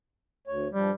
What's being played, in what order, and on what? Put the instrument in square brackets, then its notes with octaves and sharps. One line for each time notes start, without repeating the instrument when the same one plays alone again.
[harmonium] D2 C#5
[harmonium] G2 F3 [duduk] G3